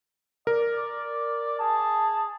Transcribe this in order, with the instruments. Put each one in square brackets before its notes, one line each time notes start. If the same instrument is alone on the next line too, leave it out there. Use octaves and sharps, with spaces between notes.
[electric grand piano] A#4 [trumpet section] D5
[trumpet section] G#4 A5